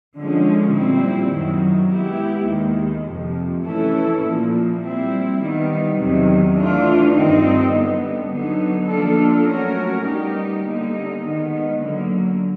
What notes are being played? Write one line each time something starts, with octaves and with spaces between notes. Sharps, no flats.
D3 F3 G#3 C#4
A#2 G3 C4 E4
F#2 D#3 F#3
G#3 B3 E4 G4
D#2 D#3 G#3
F2 C3 F3
E3 A3 C#4 E4 A4
A#2 F3 A#3
G3 C4 E4
D#3 G3 B3
E2 C3 D#3 F#3
E3 A3 D4 F4
G2 D#3 G3 C4 D#4
D3 G3 B3
D3 F#3 B3 D#4
F3 A#3 D4 F4 A4
F#3 A3 C#4 F#4 A#4
G3 B3 D#4 G4
D3 G3 A#3 D#4
D#3 G#3 B3
D3 F#3 A#3